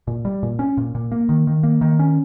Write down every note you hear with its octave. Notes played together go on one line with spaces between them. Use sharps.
A#2
G3
A#2
C#4
A#2
A#2
A#3
D#3
D#3
A#3
D#3
C#4